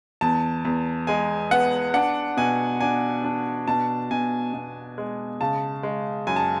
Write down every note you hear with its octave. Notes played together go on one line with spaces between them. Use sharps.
E2 A5
E2
G#3 G#5
B3 F#5
D4 F#5
B2 G#5
D4 G#5
D4
B2 A5
B2 G#5
B2
G#3
C#3 A5
G#3
F#2 G#5
A5